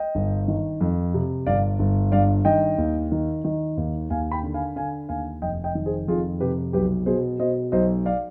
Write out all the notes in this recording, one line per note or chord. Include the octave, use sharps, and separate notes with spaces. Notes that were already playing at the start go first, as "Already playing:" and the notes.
Already playing: D#5 G5
G1
D#3
F2
C3
G1 D5 F5
G1
G2 D5 F5
D#3 D#5 G5
D#2
D#3
D#3
D#2
D#2 F5 G#5
G5 B5
D3
F5 G#5
D3 F5 G#5
D#2 F5 G#5
F1 D#5 G5
D#5 G5
D#3
G#4 C5
F2 F4 G#4
C3 G4 B4
B1 G4 B4
B2 G#4 C5
B2 C5 D#5
B1 C5 D#5
D5 F5